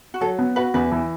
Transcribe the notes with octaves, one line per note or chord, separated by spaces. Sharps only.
F#4
F#3 A4
B3
F#4 B4
E2 B4
E3